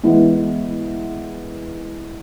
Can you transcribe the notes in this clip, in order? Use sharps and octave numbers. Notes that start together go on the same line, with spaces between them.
E3 G#3 B3 E4